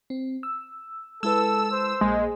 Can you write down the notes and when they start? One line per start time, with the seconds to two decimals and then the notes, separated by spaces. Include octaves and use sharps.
0.10 C4
0.43 E6
1.23 G#3 E4 A4 B4 E6
1.72 C5
2.01 A#1 G#3 A#3